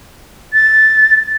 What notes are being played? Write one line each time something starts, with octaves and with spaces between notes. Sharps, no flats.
A6